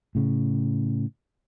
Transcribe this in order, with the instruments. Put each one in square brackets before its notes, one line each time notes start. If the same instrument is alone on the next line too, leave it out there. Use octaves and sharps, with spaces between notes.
[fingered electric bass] A2 C#3